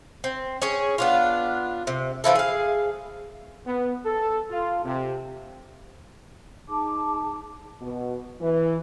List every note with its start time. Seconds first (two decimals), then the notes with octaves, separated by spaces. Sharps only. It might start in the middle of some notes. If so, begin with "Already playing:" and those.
0.24 C4
0.62 C#4 G#4 C#5
0.98 B3 D4 F4
1.87 C3
2.24 E3 F3 E4 A4
2.35 G#4 F5
3.67 B3
4.05 A4
4.51 F4
4.85 C3
6.69 D#4 G#4 A5 D6
7.82 B2
8.41 E3